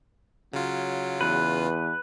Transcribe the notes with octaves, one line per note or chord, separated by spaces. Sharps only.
C#3 F#3 F4
E2 B4